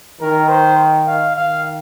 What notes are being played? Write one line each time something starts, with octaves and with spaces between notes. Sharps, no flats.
D#3 A#4
C5
F5
D#3 F5